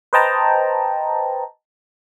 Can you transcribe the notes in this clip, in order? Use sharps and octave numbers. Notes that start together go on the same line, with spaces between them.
B4 C5 D#5 G5 A5 A#5